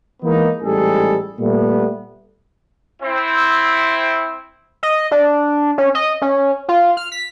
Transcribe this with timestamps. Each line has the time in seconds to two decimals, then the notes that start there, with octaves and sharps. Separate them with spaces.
0.23 E3 G#3 A#3 B3 D#4
0.61 A1 G#2 G3 G#4 A4
1.39 A#2 G3 A3 B3
3.02 C4 E4
4.83 D#5
5.11 D4
5.78 C#4
5.95 D#5
6.22 C#4
6.68 F4
6.97 F6
7.12 B6